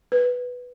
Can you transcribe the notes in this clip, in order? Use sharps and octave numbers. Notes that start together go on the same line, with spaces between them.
B4